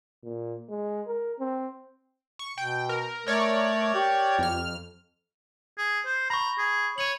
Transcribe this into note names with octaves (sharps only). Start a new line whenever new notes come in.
A#2
G#3
A#4
C4
C#6
B2 G5
A#4
A3 A#4 C#5 D5
G4
F2 F6
G#4
C5
A#5 B5 C#6
G#4
C#5 D#7 F#7